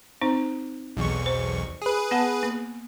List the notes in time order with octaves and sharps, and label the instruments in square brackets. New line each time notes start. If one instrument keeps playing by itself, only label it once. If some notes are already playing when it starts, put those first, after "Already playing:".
[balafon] C4 D#4 C5
[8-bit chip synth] B1 E2 C#6
[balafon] C5
[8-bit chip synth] G#4 B4
[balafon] B3 F#5 A5
A#3